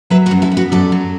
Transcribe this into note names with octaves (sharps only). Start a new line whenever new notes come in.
F#3 B4 E5
F#4 B4
F#2
E4 A4
B3
F#4 B4
F#2 A4 D5
F#3